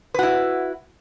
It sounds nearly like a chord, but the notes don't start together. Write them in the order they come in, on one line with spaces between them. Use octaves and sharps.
B4 F#4 E4